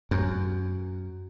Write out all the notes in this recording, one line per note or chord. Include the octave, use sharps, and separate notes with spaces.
F#2